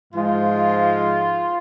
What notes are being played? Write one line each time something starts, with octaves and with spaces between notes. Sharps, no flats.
G#2 F3 G#3 F4